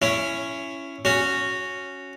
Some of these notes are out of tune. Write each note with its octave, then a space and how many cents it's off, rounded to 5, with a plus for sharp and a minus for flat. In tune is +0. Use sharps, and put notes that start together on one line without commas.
C#4 +0 E4 +20
C#4 +0 F#4 +0